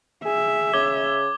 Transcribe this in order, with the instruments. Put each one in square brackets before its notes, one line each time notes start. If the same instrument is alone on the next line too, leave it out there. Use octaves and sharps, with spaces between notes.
[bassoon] G#4 [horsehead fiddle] E5
[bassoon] C#3 [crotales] D6 G#6 G7